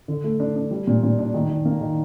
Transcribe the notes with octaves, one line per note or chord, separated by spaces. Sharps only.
D3
A3
D4
D4
G3
A#2
A#2
D4
D#3
D#3
A#3
D#3